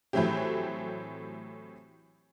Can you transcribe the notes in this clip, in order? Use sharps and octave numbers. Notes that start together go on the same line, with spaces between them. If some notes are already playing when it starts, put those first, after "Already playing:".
A2 E3 F#3 A3 C4 G4